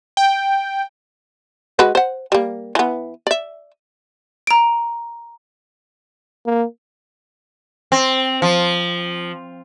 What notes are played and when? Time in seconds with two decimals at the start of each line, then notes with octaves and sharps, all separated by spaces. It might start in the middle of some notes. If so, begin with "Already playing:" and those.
0.17 G5
1.79 G#3 F#4 B4
1.95 C5 F#5
2.32 G3 A#3
2.75 E3 B3
3.27 D5 E5
4.47 A#5 D7
6.46 A#3
7.92 C4
8.42 F3